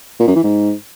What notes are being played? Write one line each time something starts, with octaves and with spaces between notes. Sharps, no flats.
A#2
F#2
E3
G#2